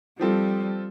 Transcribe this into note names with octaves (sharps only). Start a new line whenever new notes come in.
F3 G3 C4 F4 A4